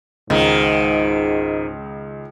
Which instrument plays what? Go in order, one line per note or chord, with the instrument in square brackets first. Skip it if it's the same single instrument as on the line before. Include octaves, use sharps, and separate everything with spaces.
[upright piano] C#2 [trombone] G#2 [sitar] D#3